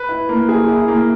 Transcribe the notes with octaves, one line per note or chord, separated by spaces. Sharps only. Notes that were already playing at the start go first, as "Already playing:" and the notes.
Already playing: B4
E4
A#3
G#4
E4
A#3